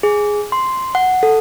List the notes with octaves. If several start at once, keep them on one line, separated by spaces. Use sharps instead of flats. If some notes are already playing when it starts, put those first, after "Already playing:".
G#4
C6
F#5
A4